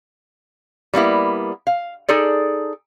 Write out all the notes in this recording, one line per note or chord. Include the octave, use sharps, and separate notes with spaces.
G3 A#3 B3 E4
F5
D#4 G#4 A4 D5